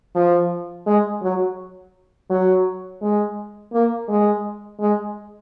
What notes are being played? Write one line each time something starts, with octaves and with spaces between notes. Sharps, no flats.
F3
G#3
F#3
F#3
G#3
A#3
G#3
G#3